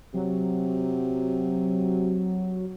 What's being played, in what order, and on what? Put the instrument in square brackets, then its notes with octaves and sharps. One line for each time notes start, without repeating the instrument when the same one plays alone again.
[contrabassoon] C3 [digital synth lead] F#3